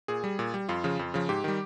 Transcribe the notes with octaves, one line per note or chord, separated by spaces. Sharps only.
A#2 G#4
G3
A#2
G3
F2 F4
C#3 F3
F2
C#3 F3
G#2 G4
D#3 G3